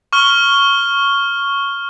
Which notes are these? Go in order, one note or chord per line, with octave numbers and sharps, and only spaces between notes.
C#6 F6 G7